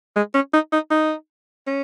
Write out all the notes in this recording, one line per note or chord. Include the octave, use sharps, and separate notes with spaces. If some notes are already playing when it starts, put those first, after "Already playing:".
G#3
C#4
D#4
D#4
D#4
C#4